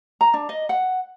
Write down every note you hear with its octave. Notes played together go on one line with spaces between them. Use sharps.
A#5
D4
D#5
F#5